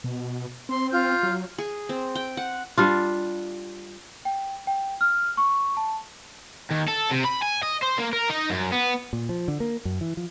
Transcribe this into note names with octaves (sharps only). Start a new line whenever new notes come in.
B2
C4 C6
F4 F6 G6
F#3
G#4
C4
G5
F#5
G3 D4 F4
G5
G5
F6
C#6
A5
D#2
A4
C3
B5
G#5
D#5
C5
A#3
A#4
D#4
F#2
B3
A#2
F3
D3
A#3
F#2
E3
F3